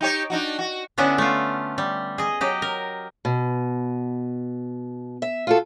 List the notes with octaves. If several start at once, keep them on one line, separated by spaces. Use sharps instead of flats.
D#4 G4 C#5
D4 D#4 F#4
F#4
D3 B3 C#4 D4 E4
A3 F4
G3
G#4 D#5
F#3 G4 D#5
A#4
B2
E5
F4 F#4 A4